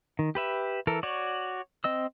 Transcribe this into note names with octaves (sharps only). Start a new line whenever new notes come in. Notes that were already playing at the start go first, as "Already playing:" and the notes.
D#3
G4 B4 E5
E3 A4 A#4
F#4 C#5 D5
C4 D#5 E6